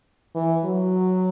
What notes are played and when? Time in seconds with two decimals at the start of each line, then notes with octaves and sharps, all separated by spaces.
0.35 E3
0.64 F#3